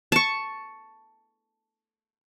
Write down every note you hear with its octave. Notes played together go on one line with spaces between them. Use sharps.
A5 C#6